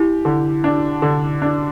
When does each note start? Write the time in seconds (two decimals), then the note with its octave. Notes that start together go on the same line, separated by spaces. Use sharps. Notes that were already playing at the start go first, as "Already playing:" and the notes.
Already playing: E4 G4
0.25 D3
0.64 D4
1.02 D3
1.42 D4